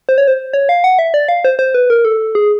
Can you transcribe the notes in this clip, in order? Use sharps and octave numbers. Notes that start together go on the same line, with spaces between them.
C5
C#5
C5
C#5
F5
F#5
E5
D5
F5
C5
C5
B4
A#4
A4
G#4